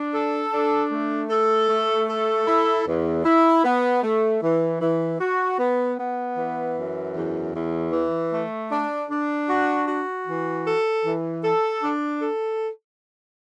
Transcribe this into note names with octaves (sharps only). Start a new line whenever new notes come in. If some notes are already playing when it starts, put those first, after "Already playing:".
Already playing: D4
A4
D4
A3
A4
A3
A4
E4
E2
E4
B3
A3
E3
E3
F#4
B3
B3
E3
F#2
E2
E2
E3
A3
D4
D4
F#4
F#4
E3
A4
E3
A4
D4
A4